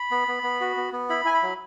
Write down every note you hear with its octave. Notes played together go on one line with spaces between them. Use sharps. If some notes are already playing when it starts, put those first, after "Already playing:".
Already playing: B5
B3
B3
B3
F#4
B3
B3
E4 B5
E4 G#5
B5
F#3